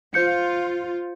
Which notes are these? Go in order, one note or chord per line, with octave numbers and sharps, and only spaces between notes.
F4 C5 G6 C#7